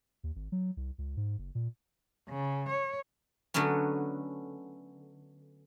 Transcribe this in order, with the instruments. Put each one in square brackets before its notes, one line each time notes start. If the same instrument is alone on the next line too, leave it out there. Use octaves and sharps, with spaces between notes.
[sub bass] D#2
G#1
F#3
C2
C#2
G#2
F#1
A#2
[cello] C#3
C#5
[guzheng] D3 F#3 A3 B3 C#4